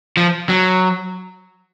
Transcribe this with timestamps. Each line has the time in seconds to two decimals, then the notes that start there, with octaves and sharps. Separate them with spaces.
0.17 F3
0.49 F#3